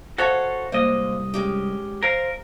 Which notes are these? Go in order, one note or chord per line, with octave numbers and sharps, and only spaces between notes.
F#4 A4 C5 C#5 F5 F#5
C2 G#3 A#3 C5 D#5
G#3 C#4 G4
A#4 C5 F5